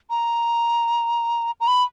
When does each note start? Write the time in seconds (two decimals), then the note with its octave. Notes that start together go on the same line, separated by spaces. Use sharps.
0.10 A#5
1.60 A#5
1.67 B5